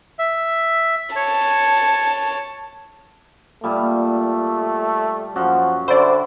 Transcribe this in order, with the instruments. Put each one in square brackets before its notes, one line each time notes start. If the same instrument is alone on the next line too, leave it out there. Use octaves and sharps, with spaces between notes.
[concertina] E5
[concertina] C#5 [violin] A5
[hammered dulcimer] A#2 G3 [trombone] A3
[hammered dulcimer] F#2 F#4 [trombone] F3
[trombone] D3 [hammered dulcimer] E4 G5 [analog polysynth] C5 D5